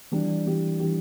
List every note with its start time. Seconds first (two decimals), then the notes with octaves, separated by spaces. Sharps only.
0.11 E3 G3 D4 G4
0.46 E3 G3 D4 G4
0.79 E3 G3 D4 G4